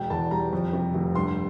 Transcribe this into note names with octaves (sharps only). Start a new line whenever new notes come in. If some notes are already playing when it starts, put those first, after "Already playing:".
Already playing: E1 G5
E2 A5
G3 A#5
F2
C3
F1
G2 C6